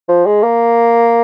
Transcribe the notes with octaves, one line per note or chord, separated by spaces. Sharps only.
F3
G#3
A#3